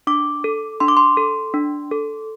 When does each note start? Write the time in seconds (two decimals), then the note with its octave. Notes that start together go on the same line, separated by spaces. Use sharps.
0.07 D4 D6
0.44 A4
0.80 D4 C6
0.88 D6
0.97 C6
1.17 A4
1.54 D4
1.91 A4